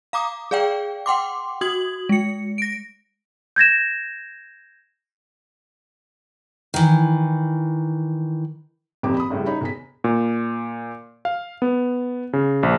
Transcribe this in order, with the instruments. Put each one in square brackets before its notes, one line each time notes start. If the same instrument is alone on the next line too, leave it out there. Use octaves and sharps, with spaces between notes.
[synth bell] F5 A#5 D6 D#6
G#4 D5 F5 G5
F#5 G5 C6 D6
F#4 D#6 G#6 F#7
G#3 C#7
A#6 D7
[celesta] G6 G#6 A#6 E7
[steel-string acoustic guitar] D#3 E3
[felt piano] D#1 G#1 F2 G4 D6
B5 D#6
A1 A2 C#3 G3
D#4 C#5 B5
E1 G#4 B6
[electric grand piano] A#2
F5
B3
C#3
A#1